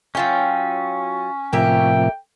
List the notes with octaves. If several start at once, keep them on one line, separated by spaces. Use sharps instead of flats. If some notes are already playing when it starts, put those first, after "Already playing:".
F#3 C#4 F4 G5
A2 C3 F3 A#3 G4 E5 G5